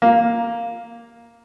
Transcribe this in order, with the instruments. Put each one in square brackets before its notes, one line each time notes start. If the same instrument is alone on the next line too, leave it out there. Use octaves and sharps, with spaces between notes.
[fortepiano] A#3